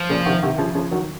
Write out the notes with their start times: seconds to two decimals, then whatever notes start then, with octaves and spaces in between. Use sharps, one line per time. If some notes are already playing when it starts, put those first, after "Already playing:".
Already playing: F3
0.09 A#2 C#3
0.26 C3 D#3
0.42 C3 D#3
0.58 C#3 F3
0.75 C#3 F3
0.91 D#3 F#3